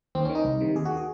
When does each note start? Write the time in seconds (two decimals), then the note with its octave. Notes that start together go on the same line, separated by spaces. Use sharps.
0.15 D#2 C4
0.25 D#3 C#4
0.35 D#4
0.44 C2
0.61 C3 D#3
0.75 D#2 G#4
0.85 F#4
0.91 D#3
0.97 G#4